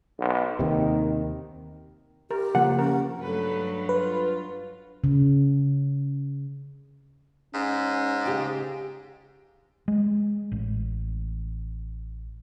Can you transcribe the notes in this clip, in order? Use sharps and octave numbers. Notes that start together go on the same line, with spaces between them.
B1
D#2 C3 D#3
G4 A#4
C#3 F3 A#3 F#5
C#4 A#4
G2 F#3 A3 A4 B4
F4 B4
C#3
G#2 C#4
C#3 G4 G5
G#3
A1